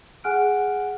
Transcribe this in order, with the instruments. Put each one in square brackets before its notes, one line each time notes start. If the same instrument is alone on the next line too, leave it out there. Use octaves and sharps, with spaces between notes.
[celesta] G#4 F#5 G#5 F6 F#6 D7